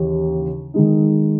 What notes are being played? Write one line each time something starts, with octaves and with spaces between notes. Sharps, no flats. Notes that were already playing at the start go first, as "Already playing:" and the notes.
Already playing: D#2 C#3 E3
D#3 G#3 D#4